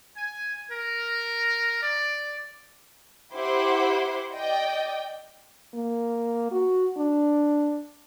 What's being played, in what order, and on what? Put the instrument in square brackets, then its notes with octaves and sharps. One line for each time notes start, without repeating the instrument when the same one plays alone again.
[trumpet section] G#5
A#4
D5
[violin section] E4 G4 C5 F#5 C6 D6
D5 D#5 G5
[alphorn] A#3
F#4
D4